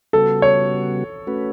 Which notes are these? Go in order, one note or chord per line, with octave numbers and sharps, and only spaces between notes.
C#3 G3 B3 F#4 A4
C#5
A3 C#4 F#4 B4